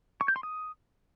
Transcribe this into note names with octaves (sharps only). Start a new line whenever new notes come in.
C#6
G6
C6
D#6